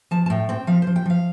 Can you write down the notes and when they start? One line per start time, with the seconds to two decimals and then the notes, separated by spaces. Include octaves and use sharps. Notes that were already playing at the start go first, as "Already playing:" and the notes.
0.11 F3 A5
0.26 A5
0.30 A2 G5
0.49 C4 G5
0.67 F3 F5
0.82 C5
0.87 F3
0.96 G5
1.06 F3 F5